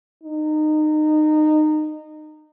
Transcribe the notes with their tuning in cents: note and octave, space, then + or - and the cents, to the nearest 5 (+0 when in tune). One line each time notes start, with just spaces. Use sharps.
D#4 -25